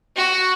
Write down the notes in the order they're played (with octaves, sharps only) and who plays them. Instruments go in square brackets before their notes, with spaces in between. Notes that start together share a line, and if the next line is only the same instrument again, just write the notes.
[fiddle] F#4